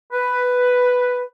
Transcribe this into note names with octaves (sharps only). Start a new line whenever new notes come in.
B4